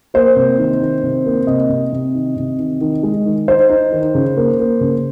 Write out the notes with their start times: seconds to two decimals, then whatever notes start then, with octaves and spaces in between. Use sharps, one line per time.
0.14 A#3 C5
0.36 C3
0.58 D#3
0.82 D#3
1.03 C3
1.25 A#3
1.47 C3 D#5
1.69 C3
1.92 C3
2.15 D#3
2.37 C3
2.59 D#3
2.81 D#3
3.03 G#3
3.26 D#3
3.48 D#4 C5
3.70 D#4
3.92 D#3
4.15 C#3
4.37 A#3
4.59 A#3
4.81 C#3